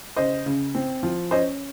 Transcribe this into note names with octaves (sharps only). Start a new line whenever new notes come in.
C#3 C5 D#5
C#3
C4
F3
C#4 C5 D#5